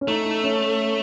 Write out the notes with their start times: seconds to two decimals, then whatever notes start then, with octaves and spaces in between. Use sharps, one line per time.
0.01 C#4
0.08 A3 D#4
0.25 D#4
0.44 C#4